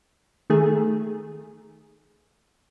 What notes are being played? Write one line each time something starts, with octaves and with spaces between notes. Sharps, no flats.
D#3 A3 G#4